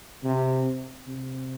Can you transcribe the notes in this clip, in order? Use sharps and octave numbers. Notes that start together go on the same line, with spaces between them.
C3
C3